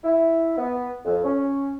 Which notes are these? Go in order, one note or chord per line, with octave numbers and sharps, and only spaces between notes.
E4
B3
F2
C#4